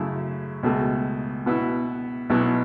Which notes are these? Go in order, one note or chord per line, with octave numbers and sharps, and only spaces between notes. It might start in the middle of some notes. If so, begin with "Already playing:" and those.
Already playing: F#2 C#3 A3 E4
C#2 B2 A3
B2 B3 E4
B1 B2 B3 E4